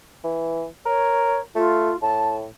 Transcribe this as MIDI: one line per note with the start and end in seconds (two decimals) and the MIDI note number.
0.24 0.66 52
0.86 1.40 70
0.86 1.41 73
1.55 1.92 57
1.55 1.97 65
2.02 2.47 45
2.02 2.36 81